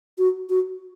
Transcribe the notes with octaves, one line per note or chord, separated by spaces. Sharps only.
F#4
F#4